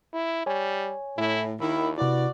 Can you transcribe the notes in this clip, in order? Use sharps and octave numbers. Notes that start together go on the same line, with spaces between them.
E4
G3 C#5 G#5
A2 E4
D#2 D#3 E4
C3 E4 F#4 B4 D5